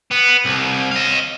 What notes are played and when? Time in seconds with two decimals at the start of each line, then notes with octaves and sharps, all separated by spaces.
0.11 B3
0.46 C2
0.91 D#5 F5